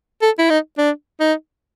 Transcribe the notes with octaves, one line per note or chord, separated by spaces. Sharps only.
A4
E4
D#4
D4
D#4